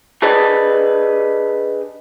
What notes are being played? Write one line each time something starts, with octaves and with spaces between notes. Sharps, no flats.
D4 G4 G#4 B4 D5 D#5